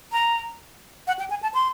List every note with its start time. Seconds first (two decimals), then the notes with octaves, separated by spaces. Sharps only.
0.12 A#5
1.07 F#5
1.19 G5
1.30 G#5
1.43 A5
1.54 C6